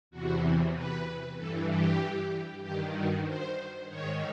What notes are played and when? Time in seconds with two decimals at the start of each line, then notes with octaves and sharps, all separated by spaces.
0.11 E2 C3 E3 F#4
0.74 B4
1.37 G2 E3 A4
1.69 G4
2.63 G2 D#3 G4
2.94 F#4
3.25 C5
3.88 G#2 D#3 C#5